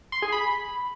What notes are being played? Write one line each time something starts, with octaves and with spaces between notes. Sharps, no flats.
C6
G#4
B5